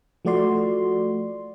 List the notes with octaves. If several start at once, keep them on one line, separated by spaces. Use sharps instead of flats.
F3 A3 F#4 D5 C6